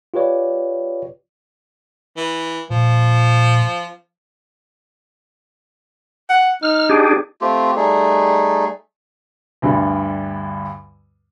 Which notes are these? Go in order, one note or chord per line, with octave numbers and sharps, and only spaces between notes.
F4 G4 B4 C#5 D5
E3
A#2 F3
F#5
D#4 F6
D4 G4 G#4
A3 C4 F4 G4
G3 A3 D#4 G#4
D2 G2 D3 G3